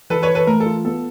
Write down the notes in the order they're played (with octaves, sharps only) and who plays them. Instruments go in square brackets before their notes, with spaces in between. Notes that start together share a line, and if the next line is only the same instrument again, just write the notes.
[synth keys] E3 [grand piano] A4 B4
[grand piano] B4 C#5
[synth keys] E3
[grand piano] A4 B4
[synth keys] A3 [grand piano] A#4
[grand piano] A4
[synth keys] F4
[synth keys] B3 [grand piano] A4